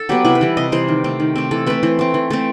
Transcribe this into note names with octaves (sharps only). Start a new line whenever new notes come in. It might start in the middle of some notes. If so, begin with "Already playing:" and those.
Already playing: A4
F#3 B3 G4
C3 E4
B4
E3 G3
C3 D#5
E3 G3 C5
D#3
A3 C4
D#3
A3 C4
E3 A4
A3 C4 B4
E3 C5
A3 C4
E3
A3 C4